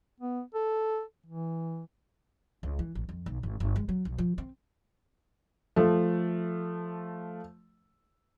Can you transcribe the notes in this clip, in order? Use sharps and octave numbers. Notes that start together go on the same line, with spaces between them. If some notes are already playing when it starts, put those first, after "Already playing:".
B3
A4
E3
C#2
E3
A1
F2
B1
G#1
G1
G#3
F#3
B1
F3
C4
F3 A3